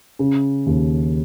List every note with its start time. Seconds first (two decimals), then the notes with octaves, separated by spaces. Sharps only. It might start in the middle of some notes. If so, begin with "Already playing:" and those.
0.19 C#3
0.66 D#2